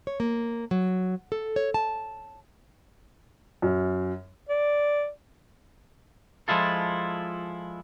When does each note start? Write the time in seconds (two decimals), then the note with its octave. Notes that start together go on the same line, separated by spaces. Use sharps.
0.07 C#5
0.20 A#3
0.71 F#3
1.32 A4
1.56 C#5
1.74 A5
3.62 F#2
4.49 D5
6.48 F3 G#3 E4 F4 A4